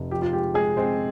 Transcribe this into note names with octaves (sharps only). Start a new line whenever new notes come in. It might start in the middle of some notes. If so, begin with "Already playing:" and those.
Already playing: F1
F3 G4
F4
G#3 G4
G#3 G#4
G#3 C4 C5